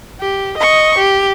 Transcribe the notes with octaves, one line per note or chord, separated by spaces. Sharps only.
G4
D#5 C#6
G4